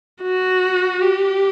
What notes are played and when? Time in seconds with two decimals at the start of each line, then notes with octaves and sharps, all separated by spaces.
0.23 F#4
1.02 G4